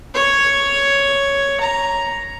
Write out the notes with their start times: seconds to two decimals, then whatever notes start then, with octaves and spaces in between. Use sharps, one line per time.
0.14 C#5
1.61 A#5